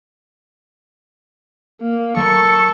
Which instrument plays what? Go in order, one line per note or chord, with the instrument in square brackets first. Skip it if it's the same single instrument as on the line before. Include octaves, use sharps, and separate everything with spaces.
[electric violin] A#3
[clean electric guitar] F#3 A#4 A#5 [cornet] A4 [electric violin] C#6